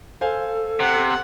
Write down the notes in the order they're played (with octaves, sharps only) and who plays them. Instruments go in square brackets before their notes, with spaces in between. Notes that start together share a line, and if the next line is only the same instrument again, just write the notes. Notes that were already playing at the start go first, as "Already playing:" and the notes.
[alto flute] A4 [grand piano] C5 F5 G#5
[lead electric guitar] C3 [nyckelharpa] F#5